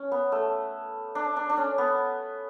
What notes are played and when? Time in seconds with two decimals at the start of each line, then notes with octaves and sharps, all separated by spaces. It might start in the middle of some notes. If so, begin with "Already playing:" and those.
Already playing: C#4
0.12 B3
0.32 A3
1.15 D4
1.36 D4
1.50 D4
1.57 C#4
1.78 B3